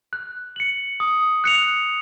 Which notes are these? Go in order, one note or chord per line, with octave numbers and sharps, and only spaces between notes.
F#6
C#7 F#7
D#6
F#6 C#7 F7